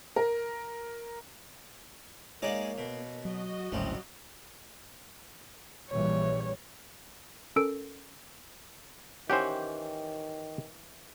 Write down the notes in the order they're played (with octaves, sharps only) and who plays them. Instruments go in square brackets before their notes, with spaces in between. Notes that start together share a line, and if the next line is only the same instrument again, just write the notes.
[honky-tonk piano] A#4
[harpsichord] G#3 D#4 D5 [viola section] A#3 [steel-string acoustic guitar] C#5 F5
[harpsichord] B2
[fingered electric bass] F#3 [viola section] F#4 D#5
[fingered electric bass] G#1 D2 [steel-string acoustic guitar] A2 C#3 C4 [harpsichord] F#3 G3
[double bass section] A#1 E3 G3 [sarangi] C#5
[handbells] C#4 A4 A#4 E6 D7
[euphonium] D#3 [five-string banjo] E3 C#4 F#5 [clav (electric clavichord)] G4 C5